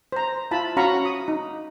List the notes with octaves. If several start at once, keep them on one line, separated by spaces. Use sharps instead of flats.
C5 A#5
E4 F4 A5 B5
C#4 F#4 F5 A#5 B5 C#6
D#6
D#4